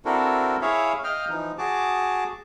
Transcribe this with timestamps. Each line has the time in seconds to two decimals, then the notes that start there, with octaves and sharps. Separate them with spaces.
0.05 C4 D4 E4 F#4 A4 A#4
0.61 E4 G#4 C#5 E5 F5
1.04 D#5 F5 G5 F6
1.29 E3 F3 D#4
1.58 F#4 G#4 A5 D6